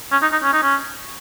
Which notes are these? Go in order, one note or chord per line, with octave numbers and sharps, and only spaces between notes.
C#4
D#4
D#4
C#4
D#4
C#4